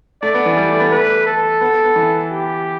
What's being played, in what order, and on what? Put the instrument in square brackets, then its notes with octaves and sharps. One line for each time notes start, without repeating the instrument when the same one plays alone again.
[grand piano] A3 [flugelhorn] D5
[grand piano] B3
E3
G3
A3
B3
[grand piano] A3 [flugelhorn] B4
[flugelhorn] A4
[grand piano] B3
B3
E3
[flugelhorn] G4